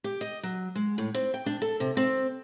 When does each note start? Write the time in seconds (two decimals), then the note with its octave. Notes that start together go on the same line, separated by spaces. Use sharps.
0.04 G4
0.21 D#5
0.43 F#3
0.75 G#3
0.98 A2
1.14 C4
1.34 G5
1.46 D4
1.62 A4
1.80 C3
1.97 C4